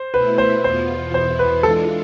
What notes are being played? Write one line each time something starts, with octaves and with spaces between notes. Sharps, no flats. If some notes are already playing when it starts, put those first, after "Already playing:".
Already playing: C5
B2 A3 E4 B4
C5
E2 B2 B3 F4 C5
E2 B2 B3 E4 C5
B4
E3 G#3 D4 F4 A4